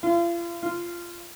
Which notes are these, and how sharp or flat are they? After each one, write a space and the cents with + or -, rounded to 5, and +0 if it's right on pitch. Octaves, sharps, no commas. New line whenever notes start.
F4 -40
F4 -15